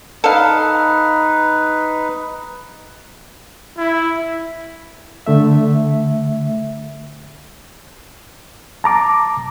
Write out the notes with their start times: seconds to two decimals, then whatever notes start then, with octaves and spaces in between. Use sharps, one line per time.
0.24 D#4 A4 B4 F5
3.78 E4
5.26 D3 A3 E5
8.84 A5 A#5 D6